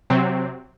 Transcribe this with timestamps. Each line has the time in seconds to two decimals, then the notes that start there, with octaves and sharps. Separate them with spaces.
0.10 C3 F#3 C4